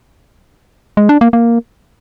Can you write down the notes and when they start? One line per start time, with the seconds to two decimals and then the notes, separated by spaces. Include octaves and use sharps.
0.97 G#3
1.09 D4
1.21 A#3
1.33 A#3